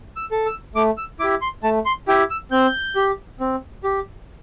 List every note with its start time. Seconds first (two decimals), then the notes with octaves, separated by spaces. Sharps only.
0.16 E6
0.31 A4
0.46 E6
0.75 A3 D6
0.98 E6
1.19 E4 G4 D6
1.41 C6
1.63 A3 A5
1.86 C6
2.08 E4 G4 G5
2.30 E6
2.51 C4 G6
2.96 G4
3.40 C4
3.84 G4